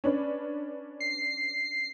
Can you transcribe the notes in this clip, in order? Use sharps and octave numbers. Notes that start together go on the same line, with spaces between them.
C#4 D4 B4
C7